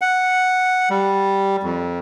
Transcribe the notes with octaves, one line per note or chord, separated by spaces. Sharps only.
F#5
G3
F2